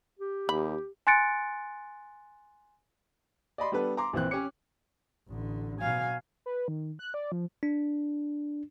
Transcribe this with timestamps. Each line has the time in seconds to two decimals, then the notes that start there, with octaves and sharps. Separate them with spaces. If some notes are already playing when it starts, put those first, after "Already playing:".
0.19 G4
0.49 D#2 B5
1.07 G#5 C6 F#6 A6 C#7 D7
3.58 D5 D#5 B5 C6
3.72 G3 B3 D4 A4 B4
3.97 A#5 C6 D6
4.13 A#1 E3 C4 F#6
4.31 C#4 G4 C#5 D6 C#7
5.28 A1 D3
5.80 B2 F#3 F5 G#5
6.46 B4
6.68 D#3
6.99 F#6
7.14 D5
7.32 F3
7.63 D4